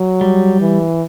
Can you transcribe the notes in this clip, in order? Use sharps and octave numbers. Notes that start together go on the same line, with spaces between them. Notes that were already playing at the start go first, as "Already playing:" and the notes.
Already playing: F#3
G3
E3